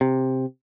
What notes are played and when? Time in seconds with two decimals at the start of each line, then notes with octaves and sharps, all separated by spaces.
0.01 C3